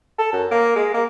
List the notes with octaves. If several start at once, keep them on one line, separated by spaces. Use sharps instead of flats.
A4
F#2
A#3
G#3
A#3